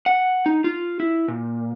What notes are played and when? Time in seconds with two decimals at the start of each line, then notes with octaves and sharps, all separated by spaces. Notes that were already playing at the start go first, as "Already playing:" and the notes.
0.06 F#5
0.46 D#4
0.64 F4
1.00 E4
1.28 A#2